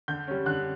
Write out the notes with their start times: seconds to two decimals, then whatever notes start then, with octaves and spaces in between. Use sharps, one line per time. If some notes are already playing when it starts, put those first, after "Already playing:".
0.08 D3 G6
0.28 G3 C#4
0.46 D3 F#6